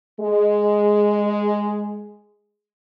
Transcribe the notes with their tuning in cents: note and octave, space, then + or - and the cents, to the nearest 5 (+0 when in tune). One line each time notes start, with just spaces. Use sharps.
G#3 +0 G#4 +0